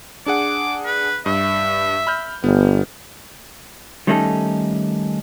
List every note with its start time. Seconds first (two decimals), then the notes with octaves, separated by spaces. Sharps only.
0.26 D4 G#4 F#5 D6
0.85 B4
1.26 G2 E5
2.07 B5 F6 G6
2.44 G1 B3
4.07 D#3 G3 A3 C#4 D#4 A4